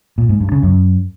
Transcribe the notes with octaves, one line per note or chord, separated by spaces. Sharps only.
A#2
G#2
G2
C#3
F#2